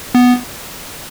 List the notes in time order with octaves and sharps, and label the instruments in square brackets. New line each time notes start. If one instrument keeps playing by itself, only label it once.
[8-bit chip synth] B3